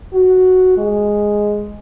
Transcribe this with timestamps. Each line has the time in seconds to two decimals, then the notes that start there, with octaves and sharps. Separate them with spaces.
0.14 F#4
0.78 G#3